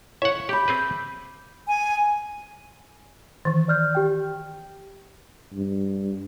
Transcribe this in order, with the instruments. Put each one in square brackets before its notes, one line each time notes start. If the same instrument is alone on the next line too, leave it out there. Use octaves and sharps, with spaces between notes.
[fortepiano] C#5 [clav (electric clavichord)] E5 F#5
[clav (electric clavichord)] G4 [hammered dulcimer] B5 D6 [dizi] G6
[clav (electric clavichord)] C4 G#4 B4
[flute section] G#5
[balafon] D#3 E3
[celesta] D5 F6 G6
G4 G5
[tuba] G2